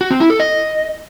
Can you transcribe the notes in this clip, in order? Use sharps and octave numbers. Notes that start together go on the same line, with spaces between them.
F#4
C4
E4
A4
D#5